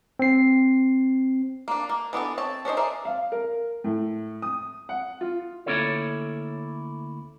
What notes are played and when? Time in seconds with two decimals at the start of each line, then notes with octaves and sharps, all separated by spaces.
0.19 C4 C7
1.68 A#3 D4
1.89 A#3
2.13 E3 B3 D4 A4
2.38 C4 C#5 A5
2.65 C#4 D4 C5 D#5
2.77 G#4 A#4 C5 D5 E5
3.05 F5
3.32 A#4
3.84 A2
4.42 D#6
4.89 F#5
5.21 F4
5.66 D2 A#3 C#4 E4 A4 C#5